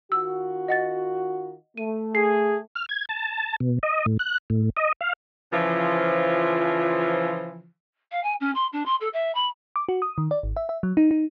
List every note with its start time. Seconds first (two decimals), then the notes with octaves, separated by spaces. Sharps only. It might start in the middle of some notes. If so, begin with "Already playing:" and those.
0.12 D#3 F4 F#4 E6
0.68 D#5 F#5 A6
1.77 A3 D#7
2.15 G#4 C7
2.75 F6
2.89 G#6
3.09 A5
3.60 B2
3.83 D#5
4.06 A2
4.19 F#6
4.50 A2
4.77 D#5
5.01 F5
5.52 C#3 E3 F3
8.11 F5
8.23 G#5
8.40 C#4
8.54 C6
8.72 D4
8.85 C6
9.00 A4
9.13 E5
9.34 B5
9.76 D6
9.89 F#4
10.02 D#6
10.18 D#3
10.31 D5
10.43 G#1
10.57 E5
10.69 E5
10.83 F#3
10.97 D#4
11.11 D#4